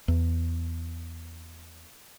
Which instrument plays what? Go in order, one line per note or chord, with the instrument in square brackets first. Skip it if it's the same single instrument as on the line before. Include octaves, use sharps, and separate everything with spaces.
[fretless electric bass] E2